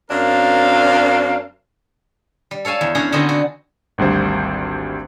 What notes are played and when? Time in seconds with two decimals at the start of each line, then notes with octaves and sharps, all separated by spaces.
0.10 F#2 C4 D4 A#4 F5
2.51 G3
2.65 A4 C#5 F5 G#5 A5
2.81 E2
2.95 C#4 D4 G#4 F#5 A#5
3.12 D3 B3 C4 D#4 F#4 A#5
3.29 F#4
3.98 G#1 D2 G3 C5